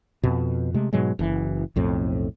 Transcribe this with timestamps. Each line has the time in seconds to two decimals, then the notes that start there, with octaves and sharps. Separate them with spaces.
0.23 F2 B2
0.74 C3 G#3 A3
0.93 G#2 B2 F#3 G#3
1.19 F#1 E3
1.76 B1 F2 A2 C4